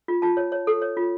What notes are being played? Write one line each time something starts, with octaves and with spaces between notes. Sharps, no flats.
F4
F4 A5
C#5
C#5
A4
C#5
F4